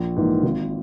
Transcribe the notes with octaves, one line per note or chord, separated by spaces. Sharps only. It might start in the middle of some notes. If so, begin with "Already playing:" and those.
Already playing: A#1
G#2 E3 A#3
G#1